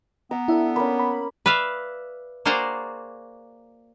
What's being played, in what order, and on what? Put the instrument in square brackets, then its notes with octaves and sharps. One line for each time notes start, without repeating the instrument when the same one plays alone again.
[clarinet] B3 [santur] A#5 D6 E6
[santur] D4 A4 [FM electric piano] E4 E5
[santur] A#3 C#4 [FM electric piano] B5
[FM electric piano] B5
[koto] B4 D5 E5 F5
A#3 F#4 G#4 C5 D5 A#5